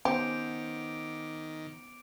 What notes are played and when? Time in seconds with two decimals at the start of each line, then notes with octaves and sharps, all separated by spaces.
0.05 D#3 B3 C#4 G4 C5 D6 C#7 D7